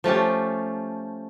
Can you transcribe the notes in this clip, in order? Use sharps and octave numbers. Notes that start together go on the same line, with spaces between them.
F3 A3 C#4 G4